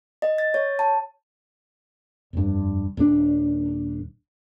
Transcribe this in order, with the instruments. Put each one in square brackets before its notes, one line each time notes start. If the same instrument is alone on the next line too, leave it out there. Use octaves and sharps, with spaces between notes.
[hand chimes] D#5
A6
C#5
A5
[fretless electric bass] F1 G2
D#1 D4